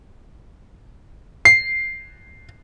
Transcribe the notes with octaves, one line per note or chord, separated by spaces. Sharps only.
C7